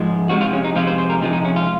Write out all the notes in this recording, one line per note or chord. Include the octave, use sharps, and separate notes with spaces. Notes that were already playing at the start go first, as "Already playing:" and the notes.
Already playing: G#2 F3 G#3
C3 F3 G#3 F#4
F4
C#4
D#4
C3 F3 G#3 F4
C5
C5
A#4
C3 F3 G#3 D#4
D#4
C#4
F4